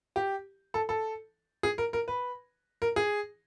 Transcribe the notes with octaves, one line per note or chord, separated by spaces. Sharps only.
G4
A4
A4
G#4
A#4
A#4
B4
A#4
G#4